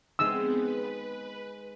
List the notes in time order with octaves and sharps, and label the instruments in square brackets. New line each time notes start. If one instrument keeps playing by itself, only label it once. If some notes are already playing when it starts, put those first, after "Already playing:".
[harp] G#3 D#4 [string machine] B3 C4 [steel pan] E6
[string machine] B4